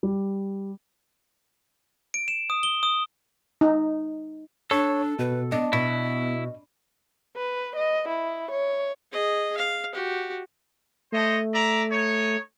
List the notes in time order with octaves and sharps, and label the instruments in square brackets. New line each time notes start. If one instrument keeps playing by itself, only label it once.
[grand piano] G3
[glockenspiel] D7
E7
D#6
G7
D#6
[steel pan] D#4
[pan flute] D4 [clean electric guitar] A4 [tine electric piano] C#5
[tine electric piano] B2 [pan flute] B4
[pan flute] B3 [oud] D4 [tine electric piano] D#5
[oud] B2 [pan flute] B3 [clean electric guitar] E4
[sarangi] B4
D#5
E4
C#5
[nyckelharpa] G#4 D#5
F5
F#4 G4
[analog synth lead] A3 [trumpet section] C5 C#5 D#5
[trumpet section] D5 E5 A#5
D#4 C#5